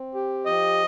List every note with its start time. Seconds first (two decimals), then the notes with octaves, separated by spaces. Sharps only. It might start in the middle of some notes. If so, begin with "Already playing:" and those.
Already playing: C4
0.14 G4
0.46 F3 D#5